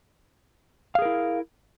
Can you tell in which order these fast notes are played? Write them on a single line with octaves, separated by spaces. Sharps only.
F5 G#4 A#4 E4